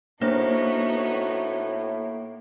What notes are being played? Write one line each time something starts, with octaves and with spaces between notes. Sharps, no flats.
A2 A#3 B3 D4 D#4 F#4 C5 C#5